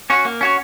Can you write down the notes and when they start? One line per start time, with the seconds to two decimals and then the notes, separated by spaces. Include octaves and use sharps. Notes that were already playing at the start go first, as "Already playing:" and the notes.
0.10 C#4 F#4 C#5
0.25 A#3
0.41 C#4 F#4 C#5